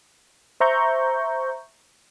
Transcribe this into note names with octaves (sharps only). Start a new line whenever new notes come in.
C5 E5 A#5 C#6 G6